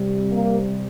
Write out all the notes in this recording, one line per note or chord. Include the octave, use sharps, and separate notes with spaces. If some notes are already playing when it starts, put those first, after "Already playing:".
Already playing: C3 G3
A#3